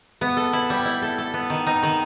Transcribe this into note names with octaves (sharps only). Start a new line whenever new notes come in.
B3
A4
E4
G3
E4
A4
A4
B3
D#3
D#4
D#3